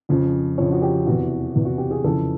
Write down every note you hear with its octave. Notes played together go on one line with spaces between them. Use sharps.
F2 C#3 F3
F2 C#3 F3 C#5
F#4
G4
E2 C3 E3 F#4
E2 C3 E3
F#4
G4
G#4
F2 C#3 E3 A4